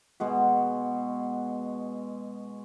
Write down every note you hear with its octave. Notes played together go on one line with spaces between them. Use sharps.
B2 G#3 F#4